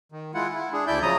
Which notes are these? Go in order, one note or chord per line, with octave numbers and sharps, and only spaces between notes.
D#3
G#3 E4 F4 F#5
E4
D4 G#4
D2 E4 D5 E5 G6
C#3 F3 F#3 A#5 D#6